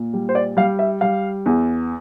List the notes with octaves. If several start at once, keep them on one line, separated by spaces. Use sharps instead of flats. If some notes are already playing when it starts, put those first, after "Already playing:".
Already playing: A#2
G3
C5
D5
G3 F5
E5
G3 F5
E2